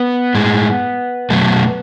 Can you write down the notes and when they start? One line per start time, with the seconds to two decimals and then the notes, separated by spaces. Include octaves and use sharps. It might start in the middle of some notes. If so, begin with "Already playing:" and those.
Already playing: B3
0.35 A2 G#3
1.30 B2 F#3 A3